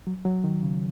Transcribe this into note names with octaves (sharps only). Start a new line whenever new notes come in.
F#3
F#3
D#3
C#3